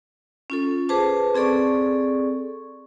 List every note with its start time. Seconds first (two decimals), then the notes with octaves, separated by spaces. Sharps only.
0.50 C#4 F4 A4
0.89 G#4 B4 C5 A5 D6
1.34 C4 G#4 A4 D5 C#6